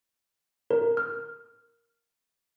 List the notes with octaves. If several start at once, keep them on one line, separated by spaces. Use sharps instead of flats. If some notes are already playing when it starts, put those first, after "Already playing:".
A#4
F6